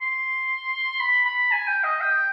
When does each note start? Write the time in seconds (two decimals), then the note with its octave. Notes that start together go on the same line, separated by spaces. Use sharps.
0.02 C6
1.00 B5
1.25 B5
1.51 G#5
1.68 G5
1.84 D#5
2.01 G5